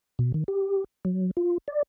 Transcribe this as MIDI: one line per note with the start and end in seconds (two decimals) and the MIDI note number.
0.19 0.32 47
0.34 0.44 51
0.48 0.84 67
1.05 1.31 54
1.37 1.58 65
1.68 1.83 74